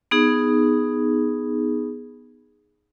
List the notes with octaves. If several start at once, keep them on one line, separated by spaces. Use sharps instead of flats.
B3 D#4 G#4